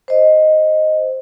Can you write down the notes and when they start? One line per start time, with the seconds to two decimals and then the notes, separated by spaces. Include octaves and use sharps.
0.08 C5 D#5